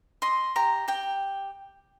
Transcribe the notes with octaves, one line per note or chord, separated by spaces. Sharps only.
D#5 C6
G4 A#5
G4 G5